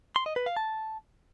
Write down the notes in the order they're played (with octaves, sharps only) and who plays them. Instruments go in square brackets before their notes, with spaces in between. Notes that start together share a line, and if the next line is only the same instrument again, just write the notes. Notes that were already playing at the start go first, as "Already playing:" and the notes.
[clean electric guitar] C6
D#5
B4
F5
A5